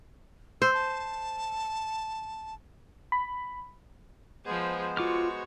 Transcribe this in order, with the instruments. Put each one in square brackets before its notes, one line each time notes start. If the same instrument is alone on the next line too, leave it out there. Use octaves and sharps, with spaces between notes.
[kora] C5 [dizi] E6
[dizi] A5
[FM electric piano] B5
[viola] F3 G#4 [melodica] G#3 B3 C5
[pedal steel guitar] F4 D6 F6 [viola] F#4 C#5